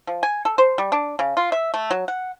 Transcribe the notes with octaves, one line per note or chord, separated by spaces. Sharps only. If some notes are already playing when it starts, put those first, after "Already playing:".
F3
G#5
A4
C5
G3
D4
C#3
F4
E5
A3
F#3
F#5